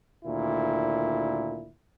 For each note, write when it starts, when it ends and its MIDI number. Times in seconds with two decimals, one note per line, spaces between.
0.25 1.70 38
0.25 1.70 46
0.25 1.70 51
0.25 1.70 64